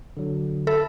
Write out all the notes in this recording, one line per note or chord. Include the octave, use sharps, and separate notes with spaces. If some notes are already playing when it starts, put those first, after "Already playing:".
D3 F#3
A4 E5 A5 B5